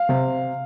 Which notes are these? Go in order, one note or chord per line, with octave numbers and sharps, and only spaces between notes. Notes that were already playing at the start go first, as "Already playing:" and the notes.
Already playing: F5
C3